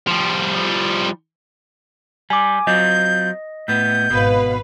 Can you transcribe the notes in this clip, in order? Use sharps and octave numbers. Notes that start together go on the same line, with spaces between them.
F3 G3
G3 G#5 D6
F#3 C4 F4 D#5 G6
A2 B3 G6
G#1 B2 B4 F5